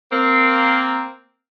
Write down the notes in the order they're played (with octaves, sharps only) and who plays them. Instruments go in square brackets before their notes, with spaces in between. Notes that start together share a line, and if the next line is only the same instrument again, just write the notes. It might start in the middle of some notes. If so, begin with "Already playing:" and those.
[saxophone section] A#3 C4